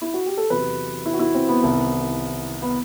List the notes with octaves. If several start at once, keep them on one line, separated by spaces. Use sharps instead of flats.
E4
F#4
G4
A4
E2 C3 F#3 B4
E4
F#4
E4
C4
B3
C2 C3 D#3
B3